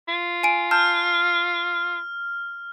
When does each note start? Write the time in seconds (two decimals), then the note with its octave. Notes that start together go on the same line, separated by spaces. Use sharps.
0.08 F4
0.43 G#5 D7
0.71 A5 F6 G6